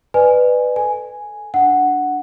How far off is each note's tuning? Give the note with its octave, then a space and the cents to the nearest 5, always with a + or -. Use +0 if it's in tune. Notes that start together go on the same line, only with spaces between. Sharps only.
B4 +10 D5 +35 G#5 +0
A4 +0 G#5 +0
D4 +0 F#5 +0